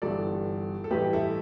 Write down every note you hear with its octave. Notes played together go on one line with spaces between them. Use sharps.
G1 G2 E3 G3 A4 D5
A4
A1 G2 E3 G4 B4
E4 A4